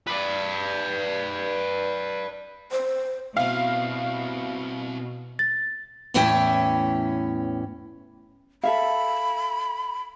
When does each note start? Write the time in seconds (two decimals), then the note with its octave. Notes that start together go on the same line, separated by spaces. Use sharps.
0.07 B4 D5
2.72 C5
3.37 B2 C4 E4 F5
5.39 A6
6.14 E2 A2 E3 C#4 E4 G5
8.63 A4 E5 F5 B5